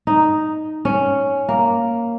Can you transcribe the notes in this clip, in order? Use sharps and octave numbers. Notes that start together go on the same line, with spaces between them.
D#4
C#4
A#3